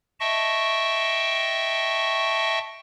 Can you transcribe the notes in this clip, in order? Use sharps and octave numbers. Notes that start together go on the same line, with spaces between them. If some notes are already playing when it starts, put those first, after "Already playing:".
D#5 E5 G5 A5 C#6